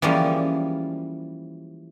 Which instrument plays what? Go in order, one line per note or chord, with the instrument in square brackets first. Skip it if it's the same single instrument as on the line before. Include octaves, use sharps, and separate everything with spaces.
[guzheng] E3 F3 G3 G#3 A#3 C#4